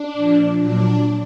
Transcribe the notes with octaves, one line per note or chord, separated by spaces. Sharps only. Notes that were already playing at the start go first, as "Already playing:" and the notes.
Already playing: D4
A#2 F3
A#2 F#3 D4